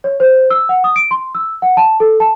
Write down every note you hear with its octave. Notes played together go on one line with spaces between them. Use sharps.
C#5
C5
E6
F#5
D#6
D7
C6
E6
F#5
A5
A4
A5